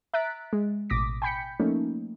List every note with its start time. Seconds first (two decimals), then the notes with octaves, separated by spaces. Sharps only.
0.14 E5 A#5 F#6 A6 B6 D7
0.53 G#3
0.90 A1 B2 D6 D#6 A#6 B6
1.22 G5 G#5 B5 G6 B6 C#7
1.60 F3 A3 A#3 C#4 D#4